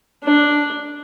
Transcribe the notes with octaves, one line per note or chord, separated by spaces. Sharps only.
D4